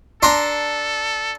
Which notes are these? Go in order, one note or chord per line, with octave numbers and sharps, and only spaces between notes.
D4 A4 A#5 C6